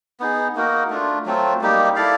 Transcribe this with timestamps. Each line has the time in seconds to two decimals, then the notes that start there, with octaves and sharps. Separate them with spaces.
0.20 B3 D#4 G#4
0.55 A#3 D#4 F#4 A#4
0.90 A3 D4 F4
1.25 F#3 A3 C4 F4
1.61 G3 A#3 D#4 G4
1.96 E4 A4 D5 F5